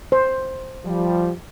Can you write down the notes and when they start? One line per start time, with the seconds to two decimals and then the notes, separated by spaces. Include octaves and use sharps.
0.12 C5
0.85 F3 G3